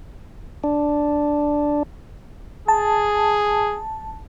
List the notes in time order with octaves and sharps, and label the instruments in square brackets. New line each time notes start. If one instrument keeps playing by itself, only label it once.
[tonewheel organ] D4
[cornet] G#4 [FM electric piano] A5